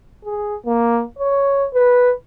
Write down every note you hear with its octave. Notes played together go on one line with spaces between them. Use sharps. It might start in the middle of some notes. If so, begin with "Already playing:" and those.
G#4
A#3
C#5
B4